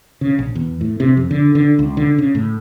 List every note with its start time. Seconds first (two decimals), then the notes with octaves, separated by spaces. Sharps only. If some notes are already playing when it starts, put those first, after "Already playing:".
0.21 C#3
0.39 A#1
0.55 E2
0.81 A2
1.00 C3
1.17 F2
1.31 D3
1.55 D3
1.79 C#2
1.97 D3
2.18 C#3
2.35 A2